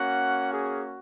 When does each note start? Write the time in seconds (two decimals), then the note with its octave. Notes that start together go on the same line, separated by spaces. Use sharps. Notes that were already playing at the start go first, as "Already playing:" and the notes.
Already playing: A#3 C#4 F#4 F#5
0.51 G#4